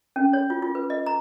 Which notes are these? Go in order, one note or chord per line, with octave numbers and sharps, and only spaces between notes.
C#4
C#5
F4
F4
B4
D#5
A#5